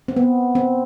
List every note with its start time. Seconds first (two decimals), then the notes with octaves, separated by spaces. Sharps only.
0.08 C4
0.16 B3
0.55 C4